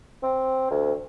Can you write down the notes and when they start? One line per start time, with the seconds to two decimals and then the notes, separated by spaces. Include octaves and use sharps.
0.23 C4
0.71 D2